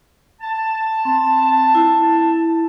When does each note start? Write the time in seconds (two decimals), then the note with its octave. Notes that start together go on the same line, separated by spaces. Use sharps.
0.41 A5
1.05 C4
1.75 E4